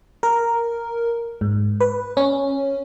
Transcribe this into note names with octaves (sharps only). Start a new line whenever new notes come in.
A#4
G#2
B4
C#4